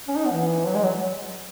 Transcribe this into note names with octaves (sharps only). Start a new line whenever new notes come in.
C#4
D#4
B3
E3
F#3
G#3
F#3